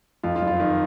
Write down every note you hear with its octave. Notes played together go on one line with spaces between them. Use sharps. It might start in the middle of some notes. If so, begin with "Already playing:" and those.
F2 F4
F4
F#1
F4
D#3